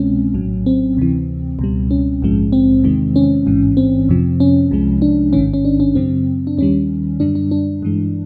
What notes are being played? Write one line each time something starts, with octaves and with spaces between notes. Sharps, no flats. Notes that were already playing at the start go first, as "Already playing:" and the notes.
Already playing: C2 B2 G#3 C4 C#4
A#1 A2 F#3
C4
D2 C3 E3
C#2 B2 G3
C#4
A#1 G#2 F3 G#3
C4
E2 C3 D#3 G#3
C#4
A1 G#2 E3
C4
F2 C3 F3
C#4
C2 C3 F3 G#3
D4
A1 G#2 D#3 C#4
C#4
D4
C#4
F#2 C#3 F#3 C4
D4
D#2 D#3 G3 C#4
F#2 D3 G3 D4
D4
D4
G2 E3 G#3